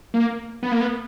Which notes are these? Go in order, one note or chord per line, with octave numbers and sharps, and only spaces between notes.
A#3
B3
A#3
B3